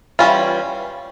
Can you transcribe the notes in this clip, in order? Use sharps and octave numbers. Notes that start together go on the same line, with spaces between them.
E3 G3 C#4 F4